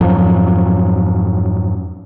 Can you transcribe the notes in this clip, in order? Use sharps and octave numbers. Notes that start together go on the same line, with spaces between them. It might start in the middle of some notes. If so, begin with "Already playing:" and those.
F2 G#2 F3 F#3